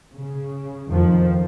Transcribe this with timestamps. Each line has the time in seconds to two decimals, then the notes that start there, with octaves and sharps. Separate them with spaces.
0.15 C#3
0.89 F2 D#3 F3